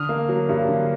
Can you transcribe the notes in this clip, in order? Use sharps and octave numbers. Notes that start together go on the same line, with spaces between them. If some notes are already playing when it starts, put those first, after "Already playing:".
Already playing: D3 D#6 F6
A#3
F#3
G2
D3